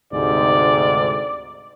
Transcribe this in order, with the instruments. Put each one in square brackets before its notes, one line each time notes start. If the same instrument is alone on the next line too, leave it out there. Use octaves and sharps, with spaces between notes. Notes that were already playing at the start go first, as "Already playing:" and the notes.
[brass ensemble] D2 G#2 C3 [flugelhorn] D5